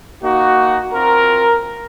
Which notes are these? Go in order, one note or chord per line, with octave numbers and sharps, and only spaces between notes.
A#3 D#4 F#4
C4 F4 A#4